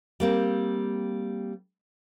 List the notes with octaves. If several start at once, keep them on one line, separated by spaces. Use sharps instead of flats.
G3 A#3 C4